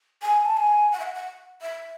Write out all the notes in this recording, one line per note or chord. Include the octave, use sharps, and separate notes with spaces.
G#5
A5
G#5
F#5
E5
F#5
F#5
E5